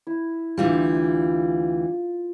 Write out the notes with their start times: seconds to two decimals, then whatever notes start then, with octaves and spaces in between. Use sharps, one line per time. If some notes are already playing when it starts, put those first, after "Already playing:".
0.07 E4
0.57 D2 E3 G3 F4